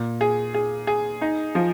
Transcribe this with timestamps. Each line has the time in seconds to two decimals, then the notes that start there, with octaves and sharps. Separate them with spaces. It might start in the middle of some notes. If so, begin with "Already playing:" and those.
Already playing: A#2
0.21 G#4
0.54 G#4
0.87 G#4
1.21 D#4
1.55 F3